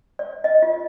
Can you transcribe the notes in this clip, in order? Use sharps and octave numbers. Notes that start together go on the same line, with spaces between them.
D5
D#5
F4